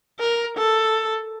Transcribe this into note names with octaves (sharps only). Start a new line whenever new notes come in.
A#4
A4